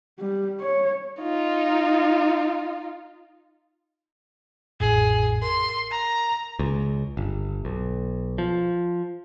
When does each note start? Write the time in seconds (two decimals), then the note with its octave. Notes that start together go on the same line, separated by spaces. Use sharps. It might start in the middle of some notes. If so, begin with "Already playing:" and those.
0.19 G3
0.61 C#5
1.22 D#4 F4
4.80 A1 F2 A2 G#4
5.42 A#4 C6
5.91 A#5
6.59 C#2
7.17 G1
7.65 B1
8.38 F3